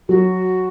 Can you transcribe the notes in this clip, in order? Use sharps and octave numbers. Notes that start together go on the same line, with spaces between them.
F#3 F#4